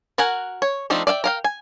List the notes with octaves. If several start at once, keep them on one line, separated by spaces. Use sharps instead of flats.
F#4 A#4 F#5 G#5
C#5
F3 A3 C4 D4 D#4
D5 E5 F5 G5
A#4 F5 G5
G#5